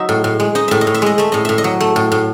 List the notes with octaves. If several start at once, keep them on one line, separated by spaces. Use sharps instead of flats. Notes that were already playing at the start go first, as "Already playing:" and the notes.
Already playing: F#3 D#4 E5
A2
A2
G#3
D#4 D#5
A2 E5
D#5
A2
E5
G#3 D#5
A3 E5
A2 D#5
A2 E5
D#5
F#3
A3
A2
A2